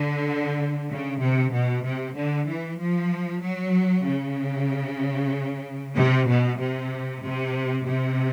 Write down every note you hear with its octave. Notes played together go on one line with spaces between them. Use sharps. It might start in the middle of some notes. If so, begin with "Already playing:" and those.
Already playing: D3
C#3
C3
B2
C3
D3
E3
F3
F#3
C#3
C3
B2
C3
C3
C3